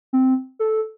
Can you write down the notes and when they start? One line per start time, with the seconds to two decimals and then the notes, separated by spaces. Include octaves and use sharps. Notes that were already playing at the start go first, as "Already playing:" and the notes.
0.13 C4
0.59 A4